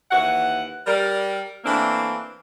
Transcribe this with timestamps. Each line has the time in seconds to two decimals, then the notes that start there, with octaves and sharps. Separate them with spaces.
0.11 D#2 E3 F#5
0.87 G3 A#4
1.64 E3 A3 A#3 C4 D4